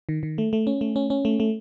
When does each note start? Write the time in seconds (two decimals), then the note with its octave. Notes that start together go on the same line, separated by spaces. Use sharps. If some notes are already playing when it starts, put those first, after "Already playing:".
0.09 D#3
0.23 D#3
0.38 A3
0.53 A3
0.67 C#4
0.81 A3
0.96 C#4
1.10 C#4
1.25 A3
1.40 A3